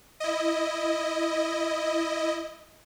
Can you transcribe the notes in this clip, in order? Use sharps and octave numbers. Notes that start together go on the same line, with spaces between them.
E4 D#5